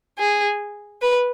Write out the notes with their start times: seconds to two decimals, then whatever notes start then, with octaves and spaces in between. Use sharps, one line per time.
0.19 G#4
1.02 B4